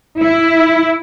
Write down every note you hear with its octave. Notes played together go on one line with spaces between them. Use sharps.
E4